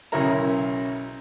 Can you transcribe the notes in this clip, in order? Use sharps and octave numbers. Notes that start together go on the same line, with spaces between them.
B1 C#3 C#4 E4 A#4 A#5